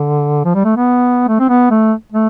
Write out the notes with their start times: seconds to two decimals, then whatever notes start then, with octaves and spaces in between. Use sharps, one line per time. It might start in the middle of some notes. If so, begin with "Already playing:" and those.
Already playing: D3
0.45 F3
0.55 G3
0.65 A3
0.76 B3
1.28 A3
1.40 C4
1.49 B3
1.71 A3
2.12 A3